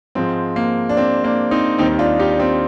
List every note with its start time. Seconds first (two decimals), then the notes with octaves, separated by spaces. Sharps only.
0.15 G#2 F3 G#3 C4
0.56 A#3
0.89 D4
0.97 C4
1.24 A#3 D4
1.51 C4 D#4
1.78 D#2 D#3 G3 C4 D#4
1.99 D4 F4
2.19 D#4 G4
2.31 D4
2.39 C4 D#4